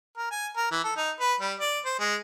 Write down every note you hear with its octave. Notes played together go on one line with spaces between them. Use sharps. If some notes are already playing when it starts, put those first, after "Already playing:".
A#4
G#5
A#4
E3
A4
D#4
B4
G3
D5
C5
G#3